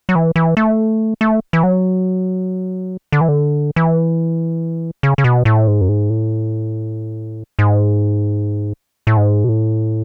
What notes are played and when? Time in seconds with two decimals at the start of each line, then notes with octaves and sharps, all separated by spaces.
0.09 F#3
0.15 E3
0.36 E3
0.57 A3
1.21 A3
1.53 E3
1.63 F#3
3.12 D3
3.21 E3
3.28 D3
3.76 E3
5.03 C#3
5.18 C#3
5.24 B2
5.45 A2
5.67 G#2
5.81 F#2
5.89 G#2
6.10 A2
7.59 G#2
9.07 A2
9.17 G#2
9.44 B2
9.49 A2